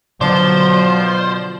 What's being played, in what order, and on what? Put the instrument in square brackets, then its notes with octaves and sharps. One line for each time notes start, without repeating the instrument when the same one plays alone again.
[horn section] B2 F3 [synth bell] D3 D5 E7 [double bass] F#3 [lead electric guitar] C5